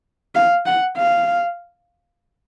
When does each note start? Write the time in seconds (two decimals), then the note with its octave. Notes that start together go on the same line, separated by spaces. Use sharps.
0.35 F5
0.66 F#5
0.97 F5